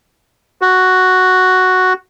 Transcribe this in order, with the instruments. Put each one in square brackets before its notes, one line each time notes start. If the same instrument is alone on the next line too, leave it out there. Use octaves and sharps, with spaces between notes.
[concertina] F#4